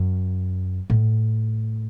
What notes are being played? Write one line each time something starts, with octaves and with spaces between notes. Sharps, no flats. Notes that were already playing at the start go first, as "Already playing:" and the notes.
Already playing: F#2
A2